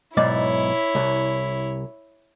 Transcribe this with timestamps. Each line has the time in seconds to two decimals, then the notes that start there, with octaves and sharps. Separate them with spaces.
0.17 B1 G#2 E4 C#5 D5
0.95 C2